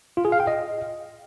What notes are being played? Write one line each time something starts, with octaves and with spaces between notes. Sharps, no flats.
F4
G#4
F5
G5
D#5